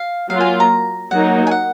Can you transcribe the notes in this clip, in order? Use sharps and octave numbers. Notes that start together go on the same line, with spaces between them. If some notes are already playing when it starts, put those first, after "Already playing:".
Already playing: F5
F#3 A#3 F4 F5
G#5
A#5
F#3 A#3 D#4 F#4 F#5
G#5
F#5